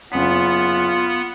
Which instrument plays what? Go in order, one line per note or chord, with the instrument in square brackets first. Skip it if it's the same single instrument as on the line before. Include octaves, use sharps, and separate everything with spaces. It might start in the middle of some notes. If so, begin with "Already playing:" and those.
[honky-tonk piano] F#1 D#6 B6 [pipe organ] B3 [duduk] F4